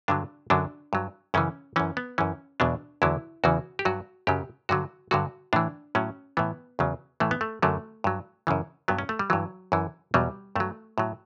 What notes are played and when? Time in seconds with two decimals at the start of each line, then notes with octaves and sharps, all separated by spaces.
0.08 G2 D3 F#3 D4
0.50 F#2 D3 F#3 D4
0.93 G2 F#3
1.34 F#2 C#3 E3 C#4
1.76 F#2 E3 C#4
1.97 B3
2.18 F#2 E3 C#4
2.60 E2 B2 F#3 D4
3.02 E2 D3 F#3 E4
3.44 E2 C#3 E3 F#4
3.79 G4
3.85 G2 F#3 F#4
4.27 F#2 C#3 F#3 G4
4.69 G2 D3 F#3 F#4
5.11 G2 D3 F#3 F#4
5.53 A2 E3 D4
5.95 A2 F#3 C#4
6.37 A2 E3 B3
6.79 E2 C#3 F#3
7.20 A2 E3 A3
7.31 B3
7.41 A3
7.62 F#2 D3 F#3 A3
8.04 G2 F#3
8.47 F#2 C#3 E3
8.88 G2 F#3 B3
8.99 C#4
9.09 A3
9.19 G3
9.30 G2 E3 F#3
9.72 F#2 E3
10.14 E2 B2 F#3 G3
10.56 G2 F#3 A3
10.98 A2 F#3